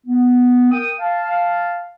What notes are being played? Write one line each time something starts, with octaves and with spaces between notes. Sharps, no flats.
B3
A#4 G5 D#6
F5 A5